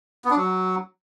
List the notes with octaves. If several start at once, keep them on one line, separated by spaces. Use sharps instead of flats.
B3
D4
F#3